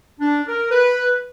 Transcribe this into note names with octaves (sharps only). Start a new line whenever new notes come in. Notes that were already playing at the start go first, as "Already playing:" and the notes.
D4
A#4
B4